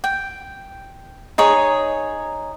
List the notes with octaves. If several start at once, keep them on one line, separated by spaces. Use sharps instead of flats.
G5
D#4 G#4 C#5